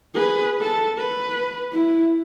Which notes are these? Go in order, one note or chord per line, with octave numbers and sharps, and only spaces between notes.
G#4 B4
A4 A5
B4
E4